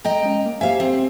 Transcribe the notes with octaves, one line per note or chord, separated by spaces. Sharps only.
D#5 G5 A#5
G#3 C#4
A#3
G4 C5 E5 F5 G#5
C4